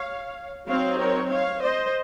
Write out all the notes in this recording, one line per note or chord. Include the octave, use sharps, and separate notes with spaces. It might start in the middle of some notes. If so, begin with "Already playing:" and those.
Already playing: C#5 F5
F#3 C4 D#4 C#5 F5
A#4 C#5
C#5 F5
C5 D#5